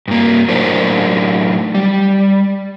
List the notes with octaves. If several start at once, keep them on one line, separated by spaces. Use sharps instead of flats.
G2 A#3
A2 F#3 D4 D#4 A#4 C5
G3